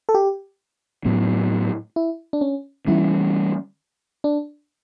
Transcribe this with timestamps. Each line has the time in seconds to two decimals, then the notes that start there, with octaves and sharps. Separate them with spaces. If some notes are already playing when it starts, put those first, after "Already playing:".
0.09 A4
0.14 G4
1.05 A2 F#3 B3
1.96 E4
2.33 D4
2.41 C#4
2.87 E3 G3 C#4 E4
4.24 D4